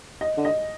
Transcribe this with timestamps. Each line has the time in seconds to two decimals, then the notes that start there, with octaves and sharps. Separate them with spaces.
0.21 D#5
0.37 D3
0.45 D#5